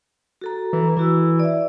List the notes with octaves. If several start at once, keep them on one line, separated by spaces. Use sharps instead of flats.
F#4 A4 A#5
E3
E3 E4 F#4 E6
D5 E5